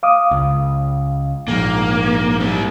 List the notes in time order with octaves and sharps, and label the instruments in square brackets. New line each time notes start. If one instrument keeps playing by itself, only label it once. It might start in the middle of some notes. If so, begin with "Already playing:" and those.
[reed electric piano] F5 D6 D#6
[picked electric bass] C#2
[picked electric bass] A#1 G#2 [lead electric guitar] A#3
[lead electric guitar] G3 C4